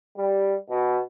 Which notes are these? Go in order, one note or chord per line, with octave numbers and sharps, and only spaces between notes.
G3
B2